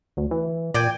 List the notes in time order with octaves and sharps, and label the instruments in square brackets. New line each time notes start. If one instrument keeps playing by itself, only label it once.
[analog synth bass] D2
E3
[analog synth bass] A#2 [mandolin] D5 G5 G#5